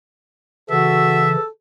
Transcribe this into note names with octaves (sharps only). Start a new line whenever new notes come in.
C#3 E3 F#4 A4 E5